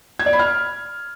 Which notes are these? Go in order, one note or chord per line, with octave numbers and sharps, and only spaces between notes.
G#6
D5
B5
F6